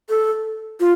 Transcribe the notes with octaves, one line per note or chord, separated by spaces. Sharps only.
A4
F4